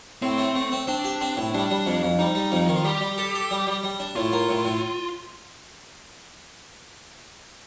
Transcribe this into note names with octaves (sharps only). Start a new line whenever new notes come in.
A2 C4
A3
A3
C4
C4 D4
G4
C4
A2
G3 D4
G3
F2
F2
G3 D#4
G3
F2
D#3
F4
G3 G4
G3
A4
A4
G3
G3
G3
D4
A2 F4
A#3
A2
A2